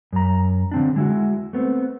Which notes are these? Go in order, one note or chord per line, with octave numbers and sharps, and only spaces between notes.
F#2 A#5
D3 C4 D4
G#3 E4 F#4
A3 B3 C4